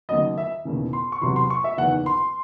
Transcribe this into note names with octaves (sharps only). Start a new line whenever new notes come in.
D#2 C#3 F#3 D#5
E5
E1 D#2 C#3 E3
C6
C#6
E2 C3 F#3 C6
C6
C#6
E5
F#1 E2 D#3 F#5
C6